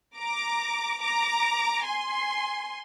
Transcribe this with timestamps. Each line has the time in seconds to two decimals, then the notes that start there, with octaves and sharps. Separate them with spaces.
0.17 A#5 D6
1.01 A#5 D6
1.85 G#5 C6